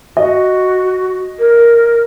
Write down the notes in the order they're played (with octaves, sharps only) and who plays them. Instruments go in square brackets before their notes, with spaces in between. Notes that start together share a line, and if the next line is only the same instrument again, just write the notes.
[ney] F#4 [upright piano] D#5
[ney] A#4